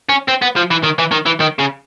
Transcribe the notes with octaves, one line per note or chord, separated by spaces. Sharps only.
C#4
C4
B3
F3
E3
D#3
E3
D#3
E3
D#3
C#3